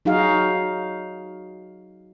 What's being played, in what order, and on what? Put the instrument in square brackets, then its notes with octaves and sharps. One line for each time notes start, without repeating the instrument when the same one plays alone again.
[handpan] F#3 D#4 F#4 G#4 F5